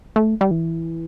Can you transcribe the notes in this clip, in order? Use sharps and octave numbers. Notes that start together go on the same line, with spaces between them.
A3
G3
E3